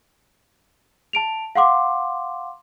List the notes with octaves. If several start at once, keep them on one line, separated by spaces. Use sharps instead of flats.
A5 D7 F7
F5 F#5 C6 D6